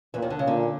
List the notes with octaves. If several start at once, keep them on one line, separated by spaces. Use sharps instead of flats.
E2 A#2 E3
D#2 D#3
D3
C#3
A#2 D3